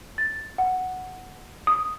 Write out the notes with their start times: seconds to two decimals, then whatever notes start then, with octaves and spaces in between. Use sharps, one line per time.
0.18 A6
0.58 F#5
1.67 D#6